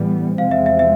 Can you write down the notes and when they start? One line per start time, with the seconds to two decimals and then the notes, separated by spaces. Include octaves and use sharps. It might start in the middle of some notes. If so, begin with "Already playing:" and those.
Already playing: A2 E3 G3 B3
0.38 E2 C3 F3 G#3 C4 F5
0.51 E5
0.66 E5
0.79 E5